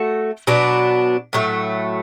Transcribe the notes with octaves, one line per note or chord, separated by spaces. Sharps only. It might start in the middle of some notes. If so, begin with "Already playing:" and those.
Already playing: A3 F#4 A4
B2 F#3 B3 D4
A2 F#3 A3